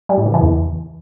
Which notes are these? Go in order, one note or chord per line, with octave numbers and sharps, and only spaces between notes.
G3
A2
C#3
E3
E2